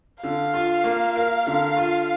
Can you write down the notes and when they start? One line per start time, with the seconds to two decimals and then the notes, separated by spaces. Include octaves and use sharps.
0.23 D3 F5
0.54 F4
0.84 A#3
1.15 A#4
1.47 D3
1.76 F4